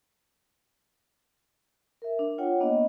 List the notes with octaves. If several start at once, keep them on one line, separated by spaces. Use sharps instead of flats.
A#4 E5
D4
F4 C#5 F#5 G5
A#3 B3 D4 D#5